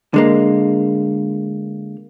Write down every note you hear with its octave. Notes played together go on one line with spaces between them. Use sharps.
D3 G#3 A#3